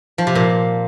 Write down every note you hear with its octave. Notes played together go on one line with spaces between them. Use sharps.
F3
C3
A#2